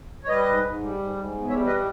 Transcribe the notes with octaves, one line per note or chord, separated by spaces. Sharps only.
C#5
G3 B4 D#5
G#2
G#2
G3
G#2
G#2
E2
G3 C#5 E5
E2 B4 D#5